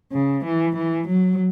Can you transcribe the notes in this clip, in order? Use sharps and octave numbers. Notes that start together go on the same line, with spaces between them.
C#3
E3
E3
F#3